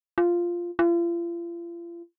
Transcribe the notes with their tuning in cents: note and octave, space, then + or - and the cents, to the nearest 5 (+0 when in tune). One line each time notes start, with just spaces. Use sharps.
F4 -5
F4 -40